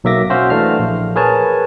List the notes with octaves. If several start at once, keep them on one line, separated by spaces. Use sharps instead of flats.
B1 F#3 A#3 E5 D6 A#6
C#4 F#4 C5 E5 F5
E3 A3 D4 F5 F6
A#1
G#4 A#4 B4 C#5 G#5 A5